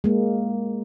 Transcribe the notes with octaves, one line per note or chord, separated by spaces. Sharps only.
G#3 A#3